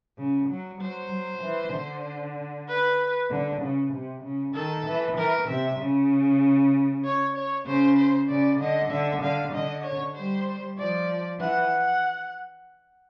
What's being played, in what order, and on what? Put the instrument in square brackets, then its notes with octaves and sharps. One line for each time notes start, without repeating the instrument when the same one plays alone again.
[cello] C#3
F#3
[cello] F#3 [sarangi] C5
[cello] F#3
E3
D3
[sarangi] B4
[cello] D3
C#3
C3
C#3
[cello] D#3 [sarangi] A4
[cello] E3
[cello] E3 [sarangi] A#4
[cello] C3 [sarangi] E5
[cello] C#3
[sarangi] C#5
C#5
[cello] C#3 [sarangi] C5
[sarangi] C5
[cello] C#3 [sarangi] D5
[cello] D3 [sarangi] D#5
[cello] D3 [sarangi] E5
[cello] D3 [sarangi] F5
[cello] D3 [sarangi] D#5
[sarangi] C#5
[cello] G3 [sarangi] C5
[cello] F3 [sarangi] D5
[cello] E3 [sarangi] F#5